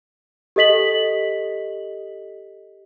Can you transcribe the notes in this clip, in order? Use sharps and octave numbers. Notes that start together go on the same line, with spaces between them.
G4 A4 D#5 B6 F#7